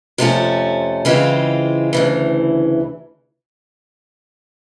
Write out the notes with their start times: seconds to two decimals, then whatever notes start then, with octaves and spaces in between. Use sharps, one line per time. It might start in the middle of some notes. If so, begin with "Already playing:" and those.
0.18 F2 C3 F3 A3 C#4
1.05 C#3 E3 G#3 C4 F4
1.93 D2 C#3 E3